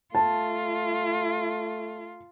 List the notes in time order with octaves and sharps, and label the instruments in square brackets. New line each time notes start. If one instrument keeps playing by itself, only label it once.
[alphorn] A3 [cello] F4 [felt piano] A5